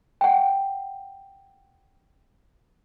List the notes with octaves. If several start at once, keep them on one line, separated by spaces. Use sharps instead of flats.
F#5 G5